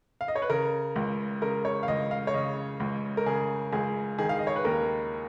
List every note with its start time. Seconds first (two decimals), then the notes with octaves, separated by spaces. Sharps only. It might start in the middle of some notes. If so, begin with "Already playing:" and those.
0.21 F5
0.28 D#5
0.36 C#5
0.42 B4
0.50 C#3 A#4
0.96 C#2
1.42 C#3 A#4
1.65 C#5
1.83 F5
1.88 C#2 D#5
2.11 F5
2.27 C#5
2.34 C#3 D#5
2.80 C#2
3.17 A#4
3.26 C#3 G#4
3.72 C#2 G#4
4.19 D#3 G#4
4.29 F5
4.39 D#5
4.47 C#5
4.56 B4
4.65 D#2 A#4